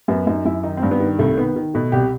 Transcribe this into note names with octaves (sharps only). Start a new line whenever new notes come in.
F#2 B3
F#2 D#4
F#2 E4
D#3 D#4
C4
G2
B3
D#3
C2 A3
D#3 B3
D#3
B2 A3
C2 G4